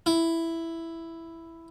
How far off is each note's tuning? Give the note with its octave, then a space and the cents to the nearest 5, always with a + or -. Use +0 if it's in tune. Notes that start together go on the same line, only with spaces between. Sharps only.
E4 +5